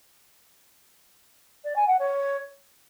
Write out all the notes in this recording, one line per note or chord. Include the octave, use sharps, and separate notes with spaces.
D5
G#5
F#5
C#5